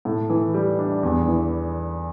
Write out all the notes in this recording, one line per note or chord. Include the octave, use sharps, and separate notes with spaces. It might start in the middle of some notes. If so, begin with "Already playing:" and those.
A2
E3
G3
D4
E2
E3